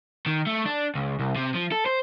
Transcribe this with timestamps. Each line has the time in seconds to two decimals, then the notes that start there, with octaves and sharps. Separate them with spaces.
0.26 D#3
0.47 A3
0.66 D4
0.95 C#2
1.20 C2
1.36 C3
1.55 F3
1.72 A4
1.86 C5